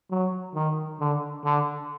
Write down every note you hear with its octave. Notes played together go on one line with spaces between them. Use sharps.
F#3
D#3
D3
D3